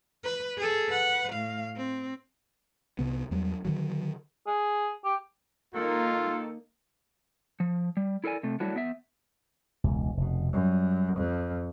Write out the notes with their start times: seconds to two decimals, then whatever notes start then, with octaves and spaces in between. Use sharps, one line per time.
0.24 B4
0.58 G#4 A4
0.89 B4 F#5
1.33 A2 F5
1.76 C4
2.99 C2 C3 B3
3.31 E2 F#3 G3
3.65 D3 D#3 F#3
4.47 G#4
5.05 G4
5.75 D#3 A#3 D#4 F4 A4
7.60 F3
7.97 G3
8.24 E4 A4 A#4 D5 G#5
8.43 C3 A3
8.60 F#3 G3 A3 D4 E4 F#4
8.76 B3 E5
9.84 E1 C#2
10.17 F1 B2
10.53 F#2 G3
11.17 F2